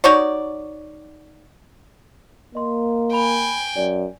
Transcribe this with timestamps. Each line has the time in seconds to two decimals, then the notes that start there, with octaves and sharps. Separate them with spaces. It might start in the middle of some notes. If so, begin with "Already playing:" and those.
0.04 D#4 F#4 C#5 D5
2.55 A#3 D#5 C6
3.13 G5 G#5 B5 F7
3.76 F#2 D5